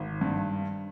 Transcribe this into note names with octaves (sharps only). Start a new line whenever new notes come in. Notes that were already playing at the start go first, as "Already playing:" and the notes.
Already playing: G#1
G2